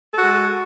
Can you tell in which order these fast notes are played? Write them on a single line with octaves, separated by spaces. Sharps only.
A4 F#4 G#3